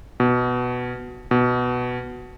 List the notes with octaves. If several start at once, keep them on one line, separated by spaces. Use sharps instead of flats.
B2
B2